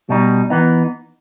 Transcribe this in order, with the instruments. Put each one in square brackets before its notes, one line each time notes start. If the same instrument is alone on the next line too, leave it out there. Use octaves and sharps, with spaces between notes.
[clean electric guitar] B2 G3 D#4
E3 B3 D#4